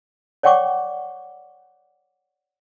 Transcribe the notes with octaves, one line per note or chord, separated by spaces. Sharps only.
C#5 D5 F#5 G5 C#6 D6